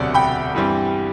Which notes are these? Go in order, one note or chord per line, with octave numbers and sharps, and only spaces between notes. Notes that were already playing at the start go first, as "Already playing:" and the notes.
Already playing: E1 D2 C3 F#3 C4 D5 F#5
G5 B5
G2 E3 G3 C4